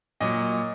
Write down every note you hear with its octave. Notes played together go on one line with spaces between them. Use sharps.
A#2 F#3 D#5